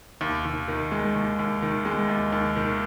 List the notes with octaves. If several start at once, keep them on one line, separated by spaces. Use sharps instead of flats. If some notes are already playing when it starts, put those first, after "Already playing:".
D#2
D#2
D#3
G#3
D#2
D#2
D#3
G#3
D#2
D#2
D#3